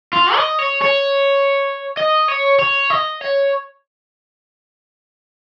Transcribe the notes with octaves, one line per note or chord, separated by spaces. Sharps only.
F4
D#5
C#5
C#5
D#5
C#5
C#5
D#5
C#5